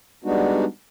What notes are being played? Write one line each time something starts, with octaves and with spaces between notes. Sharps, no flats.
G3 G#3 B3 D4 D#4 F#4